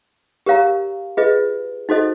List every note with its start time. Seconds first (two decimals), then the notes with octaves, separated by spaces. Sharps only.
0.46 G4 A#4 C#5 F5 A#5
1.17 F4 G#4 B4 D#5
1.89 D#4 F#4 A4 C5 D#5